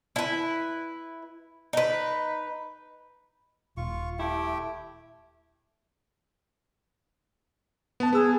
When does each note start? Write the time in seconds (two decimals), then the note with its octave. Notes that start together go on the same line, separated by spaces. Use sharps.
0.16 E4 B4
1.73 D#4 B4
3.77 D#1 F4 C#6
4.19 A3 E4 G4 G5
8.00 B3 A5
8.13 B3 G#4 E6